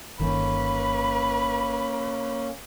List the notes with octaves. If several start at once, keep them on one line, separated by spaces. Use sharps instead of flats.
G1 D#3 A#3 C#4 B4